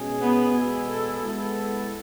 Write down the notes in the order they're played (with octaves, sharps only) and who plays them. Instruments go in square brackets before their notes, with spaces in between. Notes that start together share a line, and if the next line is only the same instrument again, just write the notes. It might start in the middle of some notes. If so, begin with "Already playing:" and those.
Already playing: [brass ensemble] B2 G#3 C#4 G#4
[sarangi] B3
[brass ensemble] B2 G#3 B3 E4 G#4
[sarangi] A4
[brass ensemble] G#3 B3 E4 A4